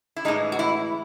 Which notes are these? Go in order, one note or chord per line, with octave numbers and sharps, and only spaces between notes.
E4
A2 E3 G#3 D#4
F#4
E4